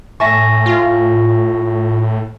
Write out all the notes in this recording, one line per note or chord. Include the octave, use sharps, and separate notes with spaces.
A2 E5 G#5 A5 C#6 A#6
F4